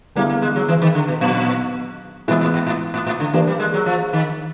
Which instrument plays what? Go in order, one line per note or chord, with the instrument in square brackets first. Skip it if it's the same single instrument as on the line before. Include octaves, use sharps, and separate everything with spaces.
[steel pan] D3 G3 B3 E4 G#4 [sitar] A#3
[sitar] A#3
G#3
F#3
E3
D#3
D3
B2
[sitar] A#2 [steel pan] F#3 B3 D#4
[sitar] A2 [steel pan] E3 G#3 B3 E4 G#4
[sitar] A2
G#2
A2
A2
A2
D3
[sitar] E3 [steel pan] A#3 D4 G4
[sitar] G3
G#3
F#3
F3
D#3